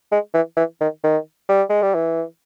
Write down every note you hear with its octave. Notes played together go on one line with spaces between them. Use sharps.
G#3
E3
E3
D#3
D#3
G3
G#3
G3
E3